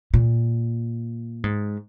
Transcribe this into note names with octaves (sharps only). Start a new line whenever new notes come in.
A#2
G#2